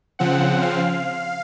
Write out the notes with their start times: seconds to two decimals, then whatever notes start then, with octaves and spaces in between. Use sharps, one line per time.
0.19 C#3 F3 C4 F#5
0.62 F5